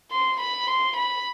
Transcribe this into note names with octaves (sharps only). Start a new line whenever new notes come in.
C6
B5
C6
B5